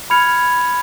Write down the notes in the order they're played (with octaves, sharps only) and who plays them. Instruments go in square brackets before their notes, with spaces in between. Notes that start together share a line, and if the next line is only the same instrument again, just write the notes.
[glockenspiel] B5 F6 G#6 C#7 F7